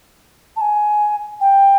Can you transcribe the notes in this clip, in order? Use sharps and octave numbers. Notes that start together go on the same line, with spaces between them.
A5
G#5
G5